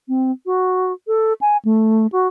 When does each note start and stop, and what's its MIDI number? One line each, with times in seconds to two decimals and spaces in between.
0.08 0.31 60
0.46 0.93 66
1.07 1.33 69
1.41 1.57 80
1.65 2.07 57
2.12 2.28 66